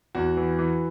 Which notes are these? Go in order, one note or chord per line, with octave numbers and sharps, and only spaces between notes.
E2 F#4
E3
E3